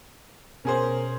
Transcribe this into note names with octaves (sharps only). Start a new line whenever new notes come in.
B2 C#4 G#4 A#4 C5